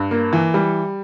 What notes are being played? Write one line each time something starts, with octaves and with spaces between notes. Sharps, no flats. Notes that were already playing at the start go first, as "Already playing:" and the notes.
Already playing: G2
A#3
E3
G3